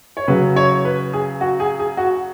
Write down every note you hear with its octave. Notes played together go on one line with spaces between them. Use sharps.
C#5
C#3 F#3 B4
C#5
B4
G#4
F#4
G#4
G#4
F#4